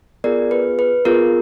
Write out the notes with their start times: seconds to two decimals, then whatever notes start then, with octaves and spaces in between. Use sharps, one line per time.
0.24 B3 F4 G#4 A#4 D5
0.51 B4
0.79 B4
1.05 B3 F4 G#4 A#4